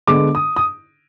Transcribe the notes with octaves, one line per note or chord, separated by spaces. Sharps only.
D3 G#3 B3 D4 D6
D#6
D#6